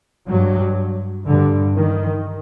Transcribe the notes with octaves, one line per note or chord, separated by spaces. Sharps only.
G2 F#3
G2 D3
D#3